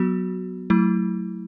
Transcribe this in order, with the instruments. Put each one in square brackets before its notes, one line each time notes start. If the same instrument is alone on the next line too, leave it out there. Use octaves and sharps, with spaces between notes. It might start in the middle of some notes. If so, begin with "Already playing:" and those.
Already playing: [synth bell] F#3 B3 F#4
F#3 A3 E4